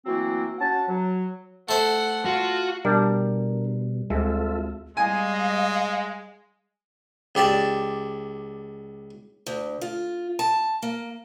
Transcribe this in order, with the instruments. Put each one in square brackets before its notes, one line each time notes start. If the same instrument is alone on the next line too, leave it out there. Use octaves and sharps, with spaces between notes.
[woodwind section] E3 F#3 A3 A#3 C4 F#4
C#4 F#4 F#5 A5
F#3
[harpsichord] A3 C5 [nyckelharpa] F#5
[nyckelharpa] F4 [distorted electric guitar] F#4 [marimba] F#5
[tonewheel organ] B2 [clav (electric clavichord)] G3 [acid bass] D4 [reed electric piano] A#4
[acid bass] D2 [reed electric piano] G#3 C4 [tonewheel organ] F4 A4 E5
[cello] G3 D#5 [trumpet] G#3 [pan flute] F5 [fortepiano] G#5
[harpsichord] C#2 G4 D5 A5
[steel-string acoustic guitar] D2
F4
A5
A#3